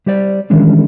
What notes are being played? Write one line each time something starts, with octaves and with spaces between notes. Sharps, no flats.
G3 G4 C5 D5
D#3 E3 G3 G#3 C#4 D4